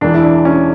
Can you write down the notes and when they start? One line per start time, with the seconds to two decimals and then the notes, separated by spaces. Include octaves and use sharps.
0.01 E1 E2 E3 D4
0.14 E4
0.24 D4
0.45 C#4